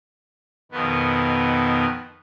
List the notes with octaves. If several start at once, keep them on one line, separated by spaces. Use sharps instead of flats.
F2 B2 D#3 B3